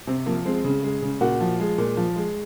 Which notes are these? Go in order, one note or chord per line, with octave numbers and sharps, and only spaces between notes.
C3 C4
F3 A#3
G#3 C4
C#3
G#3
C#3
A#2 F#4
F3
G#3
A#2
F3
G#3